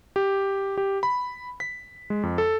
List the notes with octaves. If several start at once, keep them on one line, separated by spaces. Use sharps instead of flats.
G4
G4
B5
B6
G#3
F2
A4